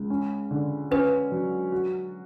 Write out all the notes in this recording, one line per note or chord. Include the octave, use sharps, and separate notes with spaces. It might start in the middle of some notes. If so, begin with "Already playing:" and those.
Already playing: C#2
C#4
D3
C#4 B4
F#3
F#4